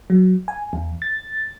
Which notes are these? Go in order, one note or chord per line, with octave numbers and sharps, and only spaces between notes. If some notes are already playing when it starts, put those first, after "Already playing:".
F#3
G#5
E2
A6